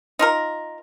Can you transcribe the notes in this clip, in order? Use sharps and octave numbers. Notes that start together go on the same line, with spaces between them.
D#4 F4 A#4